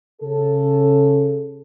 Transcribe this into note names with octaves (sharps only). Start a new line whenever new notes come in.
C#3 A4